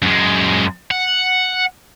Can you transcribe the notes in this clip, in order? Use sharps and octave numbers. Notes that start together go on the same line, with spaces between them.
F#2 G#3
F#5